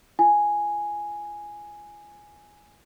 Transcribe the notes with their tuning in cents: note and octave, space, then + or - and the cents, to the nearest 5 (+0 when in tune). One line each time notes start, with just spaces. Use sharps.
F4 -35 G#5 +0